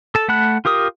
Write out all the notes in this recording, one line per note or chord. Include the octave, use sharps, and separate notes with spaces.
A4 A5
A3 F#5 A5 B5 F#6
F4 G4 A#4 D#6